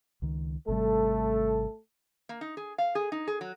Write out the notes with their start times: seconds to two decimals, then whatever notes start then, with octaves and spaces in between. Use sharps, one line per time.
0.22 C#2 D#3
0.68 G#1 C3 G3 A3 A4
2.29 A#3
2.41 D#4
2.57 G#4
2.78 F5
2.95 G#4
3.12 D#4
3.27 G#4
3.41 F#3